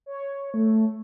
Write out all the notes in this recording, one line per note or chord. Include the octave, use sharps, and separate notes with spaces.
C#5
A3